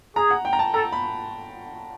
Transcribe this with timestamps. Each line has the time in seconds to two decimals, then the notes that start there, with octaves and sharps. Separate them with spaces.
0.16 G#4 A#5
0.31 F#5
0.45 G5
0.53 A#5
0.59 A5
0.74 A4 A#5
0.92 B5